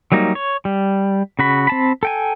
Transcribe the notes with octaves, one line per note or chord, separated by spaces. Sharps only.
F#3 G3 A#3 D#4
C#5
G3
C#3 F#4 B5
C4 A5 B5
A4 G5 G#5